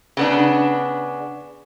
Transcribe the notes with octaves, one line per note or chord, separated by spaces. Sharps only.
C#3 B3 D4